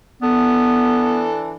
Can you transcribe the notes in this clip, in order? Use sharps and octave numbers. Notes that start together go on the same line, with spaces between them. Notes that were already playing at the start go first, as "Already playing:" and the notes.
E3 B3 D4 A4